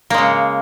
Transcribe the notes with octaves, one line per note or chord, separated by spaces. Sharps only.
C#3 G#3 A#3